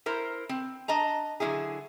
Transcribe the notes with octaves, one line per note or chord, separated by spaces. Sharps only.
E4 A#4 C5
C4
D4 D#5 A5 A#5
D3 F#3 C#4 E4 G#4